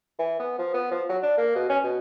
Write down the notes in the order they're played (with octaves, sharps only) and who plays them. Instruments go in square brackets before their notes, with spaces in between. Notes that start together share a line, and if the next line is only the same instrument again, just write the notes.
[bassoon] E3
B3
F3
B3
F3
F#3
D4
A#3
B2
C#4
B2